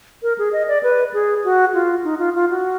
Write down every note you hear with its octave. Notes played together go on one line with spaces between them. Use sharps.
A#4
G#4
D#5
D5
B4
G#4
F#4
F4
D#4
F4
F4
F#4